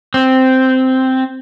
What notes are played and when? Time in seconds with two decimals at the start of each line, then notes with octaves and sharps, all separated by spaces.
0.14 C4